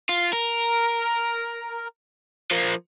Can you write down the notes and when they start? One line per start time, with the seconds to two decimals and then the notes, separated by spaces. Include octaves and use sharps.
0.09 F4
0.33 A#4
2.51 F3 A#3